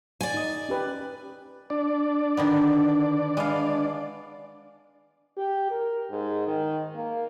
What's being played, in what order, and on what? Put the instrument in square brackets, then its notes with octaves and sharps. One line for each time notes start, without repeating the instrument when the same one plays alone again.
[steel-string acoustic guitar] D5 G#5
[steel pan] D#4 D#6
C#4 G4 B4
[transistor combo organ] D4 D5
[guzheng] D3 D#3 B3
G#3 B3 F5
[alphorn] G4
A#4
G#2
D#3
A#3